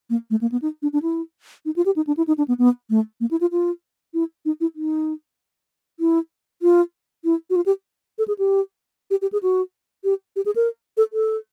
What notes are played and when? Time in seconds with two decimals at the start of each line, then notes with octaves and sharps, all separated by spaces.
0.10 A#3
0.30 A3
0.41 A#3
0.52 B3
0.62 D#4
0.82 D4
0.93 D4
1.02 E4
1.65 D#4
1.76 F4
1.86 G4
1.96 D#4
2.07 D4
2.17 E4
2.27 D#4
2.38 D4
2.48 B3
2.58 B3
2.90 A3
3.20 A#3
3.31 E4
3.41 F4
3.52 F4
4.14 E4
4.45 D#4
4.61 E4
4.75 D#4
6.00 E4
6.62 F4
7.24 E4
7.50 F#4
7.56 F4
7.66 G4
8.18 A4
8.28 G#4
8.38 G4
9.10 G4
9.22 G4
9.32 G#4
9.43 F#4
10.04 G4
10.36 G4
10.45 G#4
10.56 A#4
10.97 A4
11.13 A4